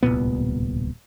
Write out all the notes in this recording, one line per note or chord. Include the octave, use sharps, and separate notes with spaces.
D1 C2 A#2 B3